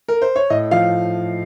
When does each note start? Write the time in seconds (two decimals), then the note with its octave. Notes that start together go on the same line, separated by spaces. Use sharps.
0.08 A#4
0.22 C5
0.36 C#5
0.50 A2 D#5
0.71 F3 F5